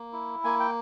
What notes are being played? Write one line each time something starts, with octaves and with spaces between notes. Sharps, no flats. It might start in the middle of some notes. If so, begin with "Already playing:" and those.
Already playing: A#3
E4
A#3 G#5
G5